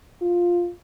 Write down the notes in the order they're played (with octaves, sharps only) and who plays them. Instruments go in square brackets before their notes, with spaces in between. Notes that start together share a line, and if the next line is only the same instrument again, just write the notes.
[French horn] F4